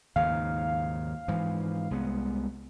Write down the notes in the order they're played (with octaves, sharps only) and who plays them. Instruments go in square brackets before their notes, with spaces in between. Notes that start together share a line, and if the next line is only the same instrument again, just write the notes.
[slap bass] D#2 G#2 C#3 [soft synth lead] F5
[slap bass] G#2 E3 F3
C2 G#3 B3